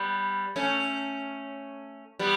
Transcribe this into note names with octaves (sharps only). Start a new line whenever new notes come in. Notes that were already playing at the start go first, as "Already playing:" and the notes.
Already playing: G3 B3
A3 C#4
G3 B3